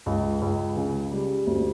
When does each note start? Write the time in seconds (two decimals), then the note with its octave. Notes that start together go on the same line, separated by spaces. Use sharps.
0.06 C#2
0.42 C#2
0.77 C#3
1.12 G3
1.47 D2